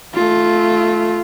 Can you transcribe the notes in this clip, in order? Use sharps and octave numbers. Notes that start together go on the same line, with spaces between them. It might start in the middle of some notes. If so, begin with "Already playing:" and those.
A3 F4